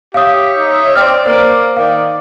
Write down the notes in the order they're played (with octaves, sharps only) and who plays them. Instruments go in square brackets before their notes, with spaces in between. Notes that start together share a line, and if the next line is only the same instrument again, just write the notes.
[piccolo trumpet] G4 [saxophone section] C#5 E5 [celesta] F5 D#6
[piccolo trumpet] D#4
[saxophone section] C4 [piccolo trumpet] D5 [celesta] F6
[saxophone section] A#3 [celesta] C5
[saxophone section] D#3 [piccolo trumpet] D5 [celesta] F5